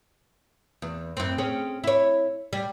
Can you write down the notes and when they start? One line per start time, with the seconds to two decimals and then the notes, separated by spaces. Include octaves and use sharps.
0.82 E2
1.17 F#2 C4
1.38 C4 C#4 G#4
1.84 E4 C#5
2.53 G3